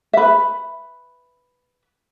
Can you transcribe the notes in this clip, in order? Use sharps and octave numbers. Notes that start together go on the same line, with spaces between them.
B4 E5